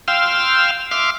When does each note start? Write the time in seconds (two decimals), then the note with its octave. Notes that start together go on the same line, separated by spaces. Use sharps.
0.08 F5 G5 C6 E6 F6
0.91 E5 F5 C6 D6 F6